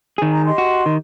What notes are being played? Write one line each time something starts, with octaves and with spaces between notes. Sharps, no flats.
D#3 G#4
A#5
G4 D#5 C6
F#4
D#3